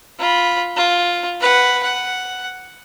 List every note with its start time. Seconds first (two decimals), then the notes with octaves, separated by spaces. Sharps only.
0.19 F4 B5
0.76 F4
1.40 B4 F#5
1.83 F#5